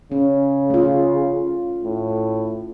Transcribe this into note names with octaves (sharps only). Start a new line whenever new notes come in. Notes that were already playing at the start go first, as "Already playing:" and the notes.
C#3 C#4
A3 F4
A2